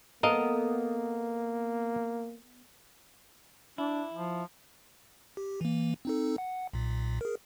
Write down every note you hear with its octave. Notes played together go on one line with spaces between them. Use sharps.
A#3 B3 A4 A#4 D#5 F5
D4 E4
F3
G4
E3 A#3
C4 D#4 A4
F#5
B1 A#2
G#4 A#4